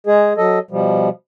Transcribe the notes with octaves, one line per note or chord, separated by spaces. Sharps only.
G#3 G#4
F#3 A4 D#5
B2 F3 G3